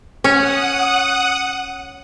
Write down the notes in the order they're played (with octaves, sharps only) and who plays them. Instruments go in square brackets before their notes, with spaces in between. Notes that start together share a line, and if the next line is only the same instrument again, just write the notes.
[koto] C#4 C#5 [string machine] F#5 D#6